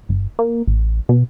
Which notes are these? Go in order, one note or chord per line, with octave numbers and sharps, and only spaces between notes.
G1
A#3
A1
B2